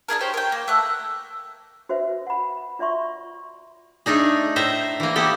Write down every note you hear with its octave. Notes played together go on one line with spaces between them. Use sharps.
D4 E4 G#4 A#4
G4 C5 C#5
A#4 G5
A#3
A3 F#5
F#4 B4 C5 E5
F#5 B5
F4 D5 E5 C6 C#6
A3 D4 D#4 G#4
A2 C5 E5 A#5
E3 A#3
A#3 B3 G4 A4